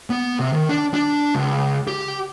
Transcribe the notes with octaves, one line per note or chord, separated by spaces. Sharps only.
B3
C3
D#3
D4
D4
C#2
G4